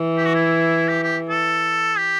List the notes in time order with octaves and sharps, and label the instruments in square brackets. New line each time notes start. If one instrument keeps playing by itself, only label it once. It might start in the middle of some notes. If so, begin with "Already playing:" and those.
Already playing: [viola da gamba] E3
[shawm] G4
F#4
E4
G4
G4
A4
G4